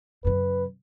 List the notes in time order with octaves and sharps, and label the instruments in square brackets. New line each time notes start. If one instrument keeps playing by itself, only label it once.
[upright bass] F#2 C#3 [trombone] B4